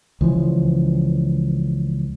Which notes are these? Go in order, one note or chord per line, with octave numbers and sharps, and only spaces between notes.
C#2 E3 F3